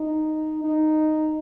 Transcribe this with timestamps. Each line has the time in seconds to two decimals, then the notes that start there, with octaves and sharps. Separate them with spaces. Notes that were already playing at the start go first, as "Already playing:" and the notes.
Already playing: D#4
0.64 D#4